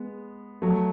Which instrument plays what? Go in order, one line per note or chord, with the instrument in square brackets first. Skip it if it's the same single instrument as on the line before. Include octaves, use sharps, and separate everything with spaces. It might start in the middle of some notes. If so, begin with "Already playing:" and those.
Already playing: [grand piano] G#3 B3
F#3 A3